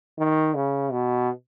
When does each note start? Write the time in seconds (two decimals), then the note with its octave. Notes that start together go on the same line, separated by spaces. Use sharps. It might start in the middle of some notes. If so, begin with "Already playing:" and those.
0.19 D#3
0.55 C#3
0.91 B2